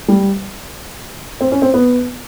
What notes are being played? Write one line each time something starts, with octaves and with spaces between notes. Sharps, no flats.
G3
C4
C#4
C4
B3